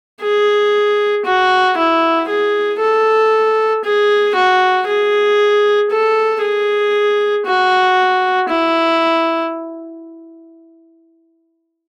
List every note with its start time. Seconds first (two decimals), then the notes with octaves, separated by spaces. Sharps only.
0.21 G#4
1.26 F#4
1.77 E4
2.28 G#4
2.80 A4
3.84 G#4
4.35 F#4
4.87 G#4
5.90 A4
6.42 G#4
7.46 F#4
8.49 E4